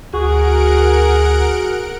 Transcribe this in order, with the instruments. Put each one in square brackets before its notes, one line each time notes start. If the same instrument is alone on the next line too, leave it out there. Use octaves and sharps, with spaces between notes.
[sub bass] D2 [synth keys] F#4 [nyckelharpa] G#4 [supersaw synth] A#4 F#5 D7